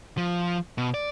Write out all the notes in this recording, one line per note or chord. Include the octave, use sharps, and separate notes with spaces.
F3
B2
D5